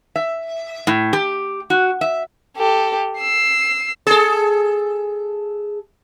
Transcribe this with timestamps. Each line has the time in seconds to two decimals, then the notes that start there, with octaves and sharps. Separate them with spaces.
0.16 E5
0.87 A2
1.13 G4
1.70 F#4
2.01 E5
2.57 G4 A4
3.20 E6 C7
4.07 G#4 A4